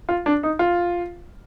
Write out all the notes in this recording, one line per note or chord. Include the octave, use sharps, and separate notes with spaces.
F4
D4
D#4
F4